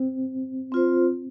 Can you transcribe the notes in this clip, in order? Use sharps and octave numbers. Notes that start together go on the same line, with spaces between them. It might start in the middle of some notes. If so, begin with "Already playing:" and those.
Already playing: C4
C4 F4 C5